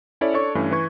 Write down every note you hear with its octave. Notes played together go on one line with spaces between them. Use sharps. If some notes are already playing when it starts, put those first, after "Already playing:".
C#4 E4 A4 C#5 D5
D4 A4 C#5 D5 C#6
G2 E3 A3 C#4
E3 B4 C#6 G#6